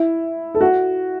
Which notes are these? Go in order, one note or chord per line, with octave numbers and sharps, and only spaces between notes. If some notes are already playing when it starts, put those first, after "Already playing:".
Already playing: E4
A4
F#4